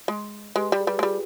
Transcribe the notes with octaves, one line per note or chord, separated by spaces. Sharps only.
G#3
G#3 G4 B4
G3
G#4
G3 G4 B4
G#3
G3 F4 G#4